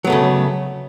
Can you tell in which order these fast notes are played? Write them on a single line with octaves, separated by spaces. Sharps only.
F#3 B3 A3 C#3